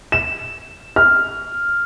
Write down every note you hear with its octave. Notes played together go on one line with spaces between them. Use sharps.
E7
F6